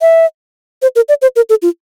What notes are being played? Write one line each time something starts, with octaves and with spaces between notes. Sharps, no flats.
E5
C5
A#4
D5
C5
A#4
A4
F4